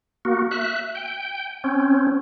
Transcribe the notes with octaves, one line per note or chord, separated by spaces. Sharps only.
A#3 F#4
E5 F#6
G5
C4 C#4